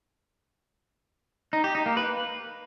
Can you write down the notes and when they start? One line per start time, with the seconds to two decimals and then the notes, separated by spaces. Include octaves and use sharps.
1.53 D#4
1.64 G4
1.75 D#4
1.86 A#3
1.97 B4